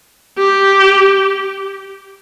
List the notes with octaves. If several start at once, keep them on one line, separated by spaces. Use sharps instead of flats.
G4